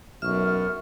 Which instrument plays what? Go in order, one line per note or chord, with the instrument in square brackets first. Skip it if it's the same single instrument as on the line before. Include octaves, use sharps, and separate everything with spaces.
[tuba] B1 [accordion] F#2 [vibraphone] E5 C#6 [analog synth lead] F6